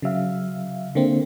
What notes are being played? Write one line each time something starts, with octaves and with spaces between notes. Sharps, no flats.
C#3 F#3 E5 F5
D3 A#3 C4